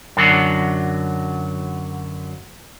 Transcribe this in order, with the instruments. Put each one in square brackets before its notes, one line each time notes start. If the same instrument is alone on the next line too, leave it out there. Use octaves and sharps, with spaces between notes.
[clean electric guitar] F#2 D3 F#3